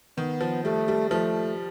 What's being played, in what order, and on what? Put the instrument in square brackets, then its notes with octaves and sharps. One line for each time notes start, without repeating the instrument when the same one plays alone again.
[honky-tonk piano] D#3 [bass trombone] B3
[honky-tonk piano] F3
[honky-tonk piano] G3 [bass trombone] A3
[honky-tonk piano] G3
[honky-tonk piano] F3 [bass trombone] A3